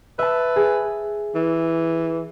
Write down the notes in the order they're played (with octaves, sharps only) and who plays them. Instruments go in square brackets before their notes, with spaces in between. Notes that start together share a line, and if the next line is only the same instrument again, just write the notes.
[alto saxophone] B4 [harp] E5 A5
[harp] G#4
[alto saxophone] E3